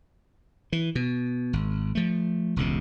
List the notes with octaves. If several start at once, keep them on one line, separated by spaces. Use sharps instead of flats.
E3
B2
G#1
F3 A3
E1 C#2 C3